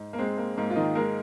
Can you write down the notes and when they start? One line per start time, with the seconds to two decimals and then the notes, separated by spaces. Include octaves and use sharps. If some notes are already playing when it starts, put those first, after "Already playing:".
Already playing: G#2
0.13 A#3
0.19 G#3 C4
0.38 A#3
0.57 G#2 A#3
0.70 F4
0.76 D#3 D#4
0.95 G#3 A#3 A#4